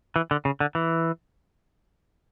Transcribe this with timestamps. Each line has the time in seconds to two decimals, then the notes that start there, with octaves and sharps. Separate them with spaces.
0.16 E3
0.31 D3
0.45 C#3
0.60 D3
0.75 E3